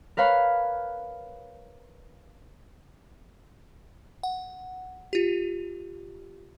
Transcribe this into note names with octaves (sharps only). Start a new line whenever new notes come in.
A#4 B4 C#5 F5 B5
F#5
F4 G4